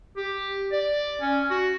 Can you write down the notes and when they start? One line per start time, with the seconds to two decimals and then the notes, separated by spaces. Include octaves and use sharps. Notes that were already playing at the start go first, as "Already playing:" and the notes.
0.17 G4
0.72 D5
1.22 C#4
1.51 F#4